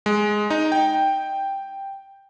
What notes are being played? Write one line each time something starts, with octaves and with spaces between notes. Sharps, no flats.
G#3
D#4
G5